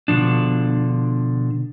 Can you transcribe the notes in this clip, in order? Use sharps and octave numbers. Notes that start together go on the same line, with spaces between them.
B2 D3 F3 D4